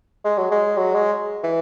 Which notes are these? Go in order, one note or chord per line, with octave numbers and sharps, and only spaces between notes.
G#3
F#3
G#3
F#3
G#3
E3